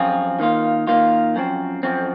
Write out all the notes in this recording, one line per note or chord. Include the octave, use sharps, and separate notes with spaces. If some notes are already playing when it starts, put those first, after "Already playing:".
Already playing: F#2 F3 C4 F4 G#4
D#3 A#3 F4
D#3 A#3 F4
F#2 F3 C4
F#2 F3 C4